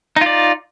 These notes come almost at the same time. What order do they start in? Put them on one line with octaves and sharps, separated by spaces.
D#4 F4 D5